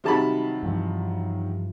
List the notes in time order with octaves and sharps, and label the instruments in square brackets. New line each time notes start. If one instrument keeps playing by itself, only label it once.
[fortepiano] C3 A5 B5 [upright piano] D#3 F#3 G3
[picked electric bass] G2 E3 F3